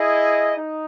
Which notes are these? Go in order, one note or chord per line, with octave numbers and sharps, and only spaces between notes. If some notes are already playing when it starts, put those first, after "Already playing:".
Already playing: E4 G#4 D#5
D#4